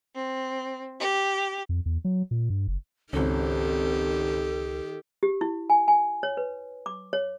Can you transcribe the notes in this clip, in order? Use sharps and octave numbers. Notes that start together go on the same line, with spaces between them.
C4
G4
F2
E2
F#3
A#2
G2
F#1
G#1 C#2 D#3 C#4 G4 A4
G4
E4
G#5
G#5
C#5
B4
D6
C#5